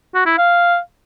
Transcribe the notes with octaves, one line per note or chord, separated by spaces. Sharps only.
F#4
E4
F5